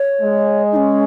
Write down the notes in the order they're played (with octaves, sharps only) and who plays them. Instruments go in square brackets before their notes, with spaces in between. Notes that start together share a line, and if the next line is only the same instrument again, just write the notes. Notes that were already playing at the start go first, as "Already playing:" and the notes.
Already playing: [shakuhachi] C#5
[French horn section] G#3
[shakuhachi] D#4
C#4